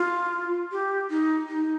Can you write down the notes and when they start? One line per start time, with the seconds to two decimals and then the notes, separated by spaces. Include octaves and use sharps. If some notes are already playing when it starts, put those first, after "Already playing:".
Already playing: F4
0.72 G4
1.10 D#4
1.48 D#4